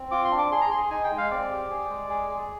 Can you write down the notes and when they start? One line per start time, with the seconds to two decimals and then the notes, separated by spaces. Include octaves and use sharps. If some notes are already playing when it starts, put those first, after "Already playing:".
Already playing: C4
0.11 F4 D6
0.24 C6
0.31 D4
0.38 D6
0.51 G#4 C6
0.61 A#5
0.70 G#4 C6
0.90 D#4 G#5
1.04 G5
1.11 G#3
1.18 F5
1.31 C4 D5
1.51 G4
1.70 G#4
1.90 G#3
2.10 G#4
2.30 G#4